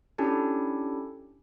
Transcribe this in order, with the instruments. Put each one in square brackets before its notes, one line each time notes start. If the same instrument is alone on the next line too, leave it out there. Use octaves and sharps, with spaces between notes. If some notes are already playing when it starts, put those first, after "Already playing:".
[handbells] C#4 D4 E4 G4 A4